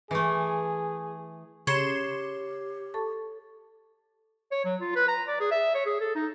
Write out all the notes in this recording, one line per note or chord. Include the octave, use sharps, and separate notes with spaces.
E3 A3 G#4
C#3 G4 C#5 C6 E7
A4 A5 C#6
C#5
F#3
F4
B4
A#5
D5
G#4
E5
C#5
G#4
A4
D#4